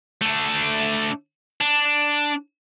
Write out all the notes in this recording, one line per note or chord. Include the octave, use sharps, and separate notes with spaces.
A3 D4
D4